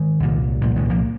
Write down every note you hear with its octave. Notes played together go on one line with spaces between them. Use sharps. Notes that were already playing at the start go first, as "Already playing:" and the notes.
Already playing: D#3 G#3
C2 A#2
C2 A#2 F3
D#3 G#3
F3 A#3